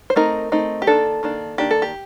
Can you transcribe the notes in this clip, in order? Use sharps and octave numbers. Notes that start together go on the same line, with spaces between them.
C5
A3 C4 D#4 A#4
A3 C4 D#4
G4
D#3 A#3 D4 A4
D#3 A#3 D4
D#3 A#3 D4 G4
A4
G4